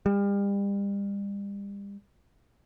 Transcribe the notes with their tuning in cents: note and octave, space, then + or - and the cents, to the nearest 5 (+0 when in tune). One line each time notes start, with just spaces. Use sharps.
G3 +35